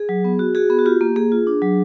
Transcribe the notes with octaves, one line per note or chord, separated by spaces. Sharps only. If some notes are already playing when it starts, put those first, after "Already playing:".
Already playing: G#4
F#3
B3
F#4
F#4 G#4
B3 G#4
F#4
F4 G4
A#3
A#3 G#4
F4
D4
F#3